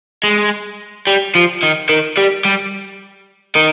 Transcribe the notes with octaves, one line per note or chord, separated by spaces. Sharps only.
G#3
G3
F3
D#3
D#3
G3
G3
D#3